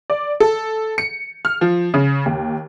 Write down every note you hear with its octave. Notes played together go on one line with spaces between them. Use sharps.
D5
A4
C#7
F6
F3
C#3
D#2